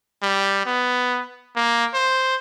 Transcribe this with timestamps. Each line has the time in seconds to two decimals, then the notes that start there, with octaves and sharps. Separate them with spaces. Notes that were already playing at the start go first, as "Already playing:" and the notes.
0.23 G3
0.66 B3
1.56 A#3
1.94 C5